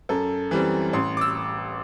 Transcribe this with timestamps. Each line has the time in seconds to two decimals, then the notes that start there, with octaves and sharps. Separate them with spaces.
0.09 F#2 A4
0.51 E3 G3 C4
0.93 A1 C6
1.17 D6
1.21 E6